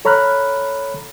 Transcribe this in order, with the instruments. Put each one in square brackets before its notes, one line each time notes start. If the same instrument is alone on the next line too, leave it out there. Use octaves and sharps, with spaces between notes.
[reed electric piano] A4 C#5 A#5 B5 F6 F#6